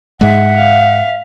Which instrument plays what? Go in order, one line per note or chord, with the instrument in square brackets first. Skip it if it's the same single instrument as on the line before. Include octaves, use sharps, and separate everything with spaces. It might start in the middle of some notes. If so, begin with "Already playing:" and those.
[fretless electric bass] G#2 G#3 [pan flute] E5 [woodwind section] F#5
[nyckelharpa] F5